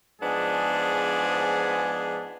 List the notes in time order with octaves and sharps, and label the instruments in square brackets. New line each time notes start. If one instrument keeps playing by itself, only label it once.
[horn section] G#2 F3 B3 D4 G#4